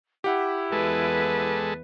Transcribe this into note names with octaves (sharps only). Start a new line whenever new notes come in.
E4 G4 F#5
E2 G#3 A4 B4